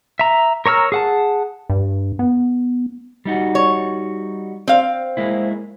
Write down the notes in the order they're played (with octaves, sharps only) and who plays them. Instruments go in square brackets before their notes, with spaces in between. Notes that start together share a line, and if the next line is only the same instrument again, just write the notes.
[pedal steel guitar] E5 A#5
A#4 C#5 A#5 E6 F6
G#4 F#5 A5
[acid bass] G2
B3
[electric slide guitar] G3 D#4 F#4
[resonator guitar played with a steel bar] C#5
C4 F5
[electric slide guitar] G#3 A#3 E4